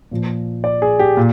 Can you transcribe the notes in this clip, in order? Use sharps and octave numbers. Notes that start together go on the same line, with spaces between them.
A#2 F3
D5
G#4
G4
A#2